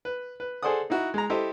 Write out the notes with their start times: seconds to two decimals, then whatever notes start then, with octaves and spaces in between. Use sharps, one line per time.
0.05 B4
0.40 B4
0.63 G#4 A4 C5 D5 F#5 D#6
0.90 D#4 E4 F#4
1.14 G#3 A#5
1.30 E4 G4 A4 C5 D#5 E5